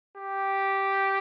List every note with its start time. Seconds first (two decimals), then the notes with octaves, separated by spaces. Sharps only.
0.17 G4